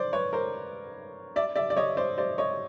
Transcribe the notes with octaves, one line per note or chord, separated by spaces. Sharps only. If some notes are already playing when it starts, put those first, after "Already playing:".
Already playing: C5 D5
B4 C#5
A#4 C5
D5 E5
D5 E5
D5
C#5 D#5
C5 D5
C5 D5
C#5 D#5